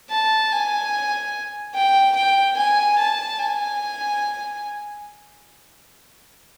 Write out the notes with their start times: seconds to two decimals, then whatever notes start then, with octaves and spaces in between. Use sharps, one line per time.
0.10 A5
0.52 G#5
1.75 G5
2.16 G5
2.57 G#5
2.98 A5
3.39 G#5